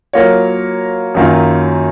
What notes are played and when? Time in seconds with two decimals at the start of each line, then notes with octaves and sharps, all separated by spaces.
0.13 F#3 A#3 F4 A#4 C#5
1.15 F#2 D#3 F#3 A#3 F4